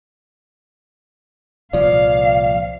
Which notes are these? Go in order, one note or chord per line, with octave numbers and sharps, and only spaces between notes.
C2 A#2 F3 D5 F5